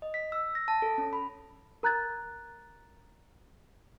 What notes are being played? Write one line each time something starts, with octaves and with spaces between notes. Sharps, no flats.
D#5
B6
E6
A#6
A5
A4
C#4
B5
A#4 A#5 F#6 G#6 A6